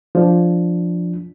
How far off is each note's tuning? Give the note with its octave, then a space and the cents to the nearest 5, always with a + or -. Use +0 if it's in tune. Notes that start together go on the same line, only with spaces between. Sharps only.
F3 +0 D4 +0